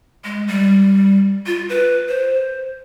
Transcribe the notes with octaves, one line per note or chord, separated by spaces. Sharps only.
G#3
G3
F4
B4
C5